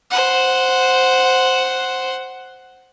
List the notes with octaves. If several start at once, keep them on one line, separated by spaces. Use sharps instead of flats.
C5 F#5